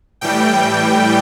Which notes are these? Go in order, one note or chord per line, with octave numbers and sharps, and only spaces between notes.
A2 E3 G3 G5